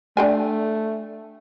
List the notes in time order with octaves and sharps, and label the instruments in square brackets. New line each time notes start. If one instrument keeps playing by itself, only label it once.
[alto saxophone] A3 [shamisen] D4 G5 G#5